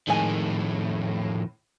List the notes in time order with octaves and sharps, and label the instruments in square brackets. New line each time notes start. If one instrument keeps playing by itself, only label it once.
[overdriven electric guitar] F2 D#3 [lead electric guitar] A2 [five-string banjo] G#3 G#5